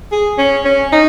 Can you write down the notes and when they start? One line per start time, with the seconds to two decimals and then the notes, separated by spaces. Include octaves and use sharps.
0.12 G#4
0.38 C#4
0.65 C#4
0.92 D#4